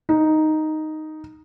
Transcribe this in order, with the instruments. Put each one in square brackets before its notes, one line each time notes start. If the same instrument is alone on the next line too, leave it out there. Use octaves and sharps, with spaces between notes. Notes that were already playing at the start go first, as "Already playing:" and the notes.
[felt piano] D#4